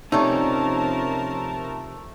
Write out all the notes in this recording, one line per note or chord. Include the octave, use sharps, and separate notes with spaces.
C3 F3 A3 C#4 D#4 A#4 D5 A5